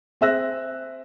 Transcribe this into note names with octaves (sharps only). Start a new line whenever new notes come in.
C4 G#4 E5 E6 F#6 A#6